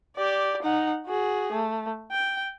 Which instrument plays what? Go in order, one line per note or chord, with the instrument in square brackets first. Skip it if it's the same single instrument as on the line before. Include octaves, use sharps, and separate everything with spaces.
[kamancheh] G4 D5
D#4 F#5
F#4 G#4
A3
G5